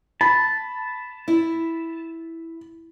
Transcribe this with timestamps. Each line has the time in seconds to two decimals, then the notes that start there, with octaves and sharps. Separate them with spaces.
0.21 A5 B5
1.28 E4